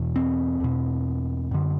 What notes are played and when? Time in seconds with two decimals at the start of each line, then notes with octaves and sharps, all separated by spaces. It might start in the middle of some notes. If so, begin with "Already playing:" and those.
Already playing: E2 B2
0.16 C4
0.60 E2 B2
1.51 F#2 D3